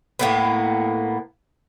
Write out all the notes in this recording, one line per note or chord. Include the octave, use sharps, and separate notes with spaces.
A2 A#3 B3